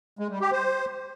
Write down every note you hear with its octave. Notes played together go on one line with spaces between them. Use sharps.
G#3
G3
G4
C5